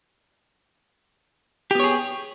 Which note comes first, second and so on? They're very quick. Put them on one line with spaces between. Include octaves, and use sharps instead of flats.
G4 B3 C#5 G#4